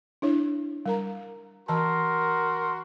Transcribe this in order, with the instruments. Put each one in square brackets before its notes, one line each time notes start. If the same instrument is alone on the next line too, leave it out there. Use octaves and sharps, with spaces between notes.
[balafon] D4 E4 C#5
G3 A#4 A#5
[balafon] E3 A5 [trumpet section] F#4 A#4 C6